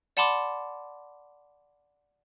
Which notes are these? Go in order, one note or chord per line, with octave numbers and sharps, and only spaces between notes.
D5 F#5 A5 B5 C6 D6